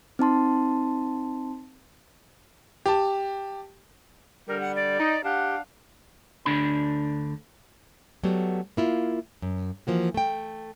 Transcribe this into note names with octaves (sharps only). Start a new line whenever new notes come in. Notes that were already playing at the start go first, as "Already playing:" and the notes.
C4 D#4 A5 C6
G4 A5
D3 G3 A#4
F#5
D5
D#4
D4 G4 F5 F#5
D2 D3 D4 B5
F#3 G3 A3 B3
A#3 E4 F4
F#2
E3 F3 A#3 F#4
A3 G5